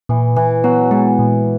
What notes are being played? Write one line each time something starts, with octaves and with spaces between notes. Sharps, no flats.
A#2 E3
A#2 E3
F#3 B3
E3 G#3
A#2